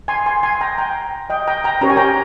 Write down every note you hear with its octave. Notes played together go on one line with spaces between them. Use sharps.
G#5 C6
G#5 C6
G#5 C6
G5 A#5
G5 A#5
D#5 G5
G5 A#5
G5 A#5
C#4 G4 A#4 C#5 A#5
G#5
G5 A#5